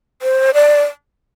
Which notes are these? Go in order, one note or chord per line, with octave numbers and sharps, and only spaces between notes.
C5
D5